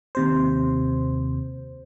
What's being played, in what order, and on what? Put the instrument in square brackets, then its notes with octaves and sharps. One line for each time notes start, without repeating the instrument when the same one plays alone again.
[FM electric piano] D#2 C3 C5